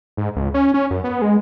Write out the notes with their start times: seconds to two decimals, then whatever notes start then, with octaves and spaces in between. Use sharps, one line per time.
0.17 G#2
0.36 C#2
0.54 C#4
0.74 C#4
0.90 F#2
1.04 B3
1.22 G#3